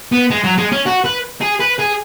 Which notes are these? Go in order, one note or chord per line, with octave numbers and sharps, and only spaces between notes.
B3
G#3
F#3
G#3
C#4
F#4
B4
G#4
B4
G#4